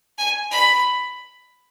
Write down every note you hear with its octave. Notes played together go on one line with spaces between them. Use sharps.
G#5
B5